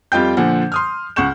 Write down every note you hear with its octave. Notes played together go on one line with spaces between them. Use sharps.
F2 G3 F4 D#5 G5 G6
A#2 D3 F3 F#5
C6 D#6 F6
C#2 F#5 C#6 G6 E7